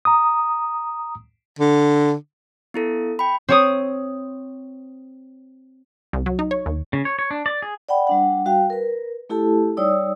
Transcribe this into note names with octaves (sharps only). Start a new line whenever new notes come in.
A#5 D#6
D3
B3 E4 A4
G5 B5
C4 C#5 D#6
C2
F#3
D#4
C#5
D#2
C#3
C#5
C#5
D4
D5
G#4
D5 F#5 G5 B5
G3 D4 F#5
G3 F#4 F5 G5
A#4 B4
A3 E4 G4 A4 A5
G3 D#4 C#5 D5 D#6 E6